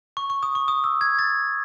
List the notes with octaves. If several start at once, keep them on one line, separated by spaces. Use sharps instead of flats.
C#6
C#6
D#6
C#6
D#6
E6
G#6
A6